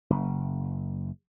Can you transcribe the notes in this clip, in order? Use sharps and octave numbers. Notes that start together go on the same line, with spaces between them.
F#1